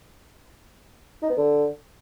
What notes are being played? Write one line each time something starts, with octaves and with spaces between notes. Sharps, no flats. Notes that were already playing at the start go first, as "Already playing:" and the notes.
D#4
B3
D3